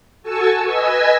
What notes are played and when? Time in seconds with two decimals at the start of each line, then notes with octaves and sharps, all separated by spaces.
0.23 F#4 A4 G#5 A5 C#6 E6
0.65 B4 D#5 G#5 E6